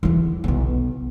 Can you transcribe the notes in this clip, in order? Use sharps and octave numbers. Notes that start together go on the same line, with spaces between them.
E2 E3
B1 B2